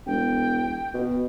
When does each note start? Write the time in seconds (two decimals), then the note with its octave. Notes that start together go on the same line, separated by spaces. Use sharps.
0.07 E1 G5
0.94 B2